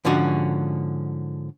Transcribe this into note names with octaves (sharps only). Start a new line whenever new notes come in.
G#2 D3 F3 C#4 F#4